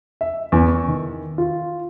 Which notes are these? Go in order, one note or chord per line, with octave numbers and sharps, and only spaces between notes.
E5
E2
C#6
D#3
F4